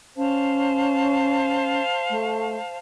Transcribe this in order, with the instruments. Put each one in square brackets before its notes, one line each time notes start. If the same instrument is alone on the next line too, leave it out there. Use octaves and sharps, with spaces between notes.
[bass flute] C#4 [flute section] C5 F5 A5
[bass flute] A3